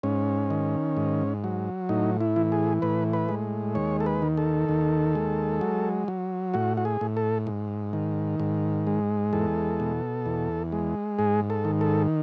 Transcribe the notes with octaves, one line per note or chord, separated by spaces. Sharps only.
G#2 C#4
D#3
G#2
F#3
A2 D#4
E4
E3
G#4
A2 B4
B4
G#3
D#2 C#5
A4
B4
D#3
A4
D#2
G#3
F#3
F#3
A2 F#4
F#4
G#4
A2
A4
G#2
D#3
G#2
G#3
E2 A4
B2
E2
G#3
G#2 G#4
A4
D#3
A4